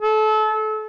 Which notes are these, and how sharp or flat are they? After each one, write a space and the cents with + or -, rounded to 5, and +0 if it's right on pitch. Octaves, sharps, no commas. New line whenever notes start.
A4 -30